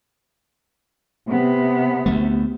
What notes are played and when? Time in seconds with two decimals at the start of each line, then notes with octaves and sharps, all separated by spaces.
1.28 C3 B3
2.06 D2 G#3 A3